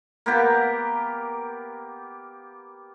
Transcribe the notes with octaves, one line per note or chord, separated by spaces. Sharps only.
A#3 B3 G4 A#4